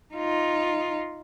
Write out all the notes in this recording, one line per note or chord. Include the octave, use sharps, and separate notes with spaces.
D#4 F4